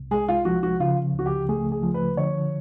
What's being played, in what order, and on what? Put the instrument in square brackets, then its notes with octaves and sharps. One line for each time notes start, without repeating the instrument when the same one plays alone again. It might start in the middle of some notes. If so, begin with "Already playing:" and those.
Already playing: [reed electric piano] C2 C3
[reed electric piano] G#3 [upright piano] G#4
[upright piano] F4
[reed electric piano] F3 [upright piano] F#4
[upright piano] F#4
[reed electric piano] C#3 [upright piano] F4
[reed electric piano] C#2 [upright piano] F#4
[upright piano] G4
[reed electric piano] A3 [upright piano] G#4
[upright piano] G#4
[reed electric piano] F3
[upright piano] B4
[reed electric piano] D3 [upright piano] C#5